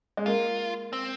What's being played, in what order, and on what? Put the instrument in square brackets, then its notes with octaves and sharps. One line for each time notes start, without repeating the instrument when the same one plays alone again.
[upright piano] G#3
[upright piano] A#3 [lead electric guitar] F4
[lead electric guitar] C4